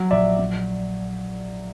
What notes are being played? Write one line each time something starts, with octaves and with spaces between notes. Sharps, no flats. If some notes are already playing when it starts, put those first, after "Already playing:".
Already playing: F#3
A#1 D5 E5
F#3